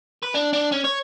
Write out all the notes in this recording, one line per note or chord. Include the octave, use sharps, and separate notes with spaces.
B4
D4
D4
C#4
C#5